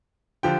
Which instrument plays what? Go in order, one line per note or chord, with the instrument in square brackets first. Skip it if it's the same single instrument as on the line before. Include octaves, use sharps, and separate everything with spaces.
[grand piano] D3 F3 G4 G5